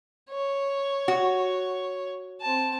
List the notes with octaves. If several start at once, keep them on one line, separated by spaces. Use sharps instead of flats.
C#5
F#4
C4 A5